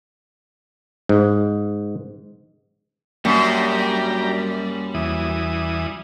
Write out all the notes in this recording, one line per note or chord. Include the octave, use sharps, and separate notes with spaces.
G#2
F#2 G3 A#3 D4 G4 A#5 C#7
E2 E3 D#6